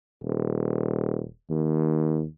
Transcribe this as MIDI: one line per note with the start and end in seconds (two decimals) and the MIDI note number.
0.23 1.25 27
1.50 2.25 39